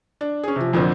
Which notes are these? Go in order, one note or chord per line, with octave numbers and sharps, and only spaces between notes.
D4
C#4 G#4
C3 F3
F2 A#2 D3 C4